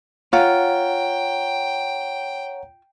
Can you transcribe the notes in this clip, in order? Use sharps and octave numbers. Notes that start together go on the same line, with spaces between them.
F4 C#5 F#5 G5 A#5